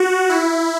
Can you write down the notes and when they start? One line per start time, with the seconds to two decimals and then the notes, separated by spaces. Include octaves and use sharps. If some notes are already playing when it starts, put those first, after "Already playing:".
Already playing: F#4
0.29 E4